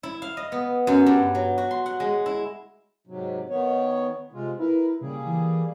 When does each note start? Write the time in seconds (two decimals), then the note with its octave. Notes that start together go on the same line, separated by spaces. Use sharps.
0.03 E4
0.22 F5
0.37 D#5
0.52 B3
0.87 F#2
1.06 G2
1.35 F#3
1.58 F#4
1.71 C6
1.86 F#5
2.00 G#3
2.26 E4
3.07 G#2 C3 F#3
3.50 D#3 B3 C#5
4.33 C3 G#3 F4
4.59 E4 A#4 B4
5.01 C#3 G3 A#3 G#4
5.25 E3